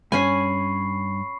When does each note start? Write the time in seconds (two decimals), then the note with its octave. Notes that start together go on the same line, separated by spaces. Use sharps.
0.12 G2 C#4 G#5 B5 C#6 C7